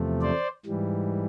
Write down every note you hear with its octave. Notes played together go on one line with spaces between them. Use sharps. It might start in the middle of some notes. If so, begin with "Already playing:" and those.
Already playing: E2 C3 F3 A3
C5 D5
G#2 E3 G3